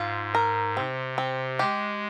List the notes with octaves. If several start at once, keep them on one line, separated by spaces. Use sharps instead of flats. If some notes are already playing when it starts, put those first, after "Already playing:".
Already playing: G#2 F4
A#4
C3 C4
C4
G#3 G4